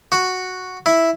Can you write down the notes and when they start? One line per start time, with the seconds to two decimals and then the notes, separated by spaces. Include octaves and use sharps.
0.12 F#4
0.86 E4